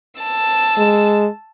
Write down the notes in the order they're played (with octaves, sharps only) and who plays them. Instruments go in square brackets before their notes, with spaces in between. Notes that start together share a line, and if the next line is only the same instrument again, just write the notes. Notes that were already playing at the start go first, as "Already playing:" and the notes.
[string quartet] A5 E6
[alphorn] G#3